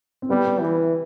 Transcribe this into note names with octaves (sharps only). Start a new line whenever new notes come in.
C4
G3 B3
B3
E3